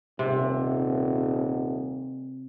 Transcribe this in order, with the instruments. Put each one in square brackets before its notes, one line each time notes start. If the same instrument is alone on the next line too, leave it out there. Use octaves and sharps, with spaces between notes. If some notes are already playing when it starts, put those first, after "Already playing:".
[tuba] D#1 [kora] C3